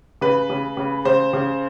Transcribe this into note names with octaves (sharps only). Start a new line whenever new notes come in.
C#3 B4
C#3
C#3
C#3 C5
C#3